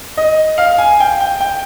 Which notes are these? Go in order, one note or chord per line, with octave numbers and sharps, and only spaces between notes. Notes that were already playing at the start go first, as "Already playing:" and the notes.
D#5
F5
G#5
G5
G5
G5